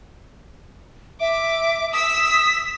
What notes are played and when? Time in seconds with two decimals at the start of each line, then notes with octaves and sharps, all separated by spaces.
1.20 E5 D6
1.92 D#6 E6 B6